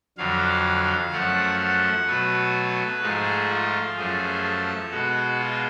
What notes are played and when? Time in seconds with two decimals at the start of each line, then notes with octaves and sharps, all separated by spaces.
0.18 F2 D3 F#3 F5
1.13 F#2 F3 A3 F#5
1.60 F#5
2.07 B2 F#3 A3 B4
3.02 G#2 F3 A3 G#4
3.50 F4
3.97 F#2 F3 A3 G#4
4.44 A4
4.91 B2 G#3 F#4
5.39 F4